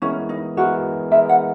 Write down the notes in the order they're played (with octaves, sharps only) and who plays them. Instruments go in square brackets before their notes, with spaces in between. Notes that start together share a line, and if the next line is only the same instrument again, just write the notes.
[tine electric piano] E3 G#3 B3 E4 A#4 [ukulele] C#4
[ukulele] D#4
[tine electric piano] E3 G#3 B3 E4 A#4 [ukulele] F#4
[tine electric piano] E3 G#3 B3 E4 A#4 [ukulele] E5
[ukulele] F#5